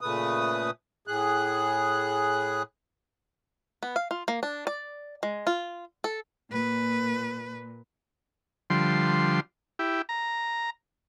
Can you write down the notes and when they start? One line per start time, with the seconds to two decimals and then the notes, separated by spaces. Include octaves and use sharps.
0.01 A#2 C#3 A3 B4 D#6
1.07 A2 G#4 F#6
3.83 B3
3.96 F5
4.11 F4
4.28 A#3
4.43 D4
4.67 D5
5.23 G#3
5.47 F4
6.04 A4
6.52 A#2 B4
8.70 D3 F3 G3 C6
9.79 E4 G4
10.09 A#5